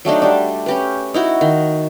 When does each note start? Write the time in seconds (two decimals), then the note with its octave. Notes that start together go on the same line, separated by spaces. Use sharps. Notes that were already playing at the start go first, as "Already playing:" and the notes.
0.05 F#3 A3 D4 D#4
0.22 G3 D4
0.66 C#4 G4 B4
1.14 D#4 E4 F#4
1.41 D#3